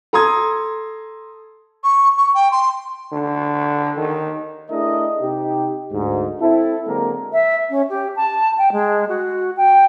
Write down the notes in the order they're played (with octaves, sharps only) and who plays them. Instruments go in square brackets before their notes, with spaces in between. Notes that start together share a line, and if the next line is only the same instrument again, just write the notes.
[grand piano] A4 A#5 C6 D#6 G#6
[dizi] C#6
C#6
G5
C6
[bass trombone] D3
D#3
[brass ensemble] A3 D4 E4 G#4 A#4 D#5
C3 D#4 G4
D2 G#2
C4 E4 A4
D3 F#3 G#3 A#3 C4 A#4
[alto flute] E5
C#4
G4
A5
G5
G#3
F#4
G5